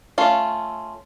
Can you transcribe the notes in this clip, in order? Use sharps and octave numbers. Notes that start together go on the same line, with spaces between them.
A3 C#4 F4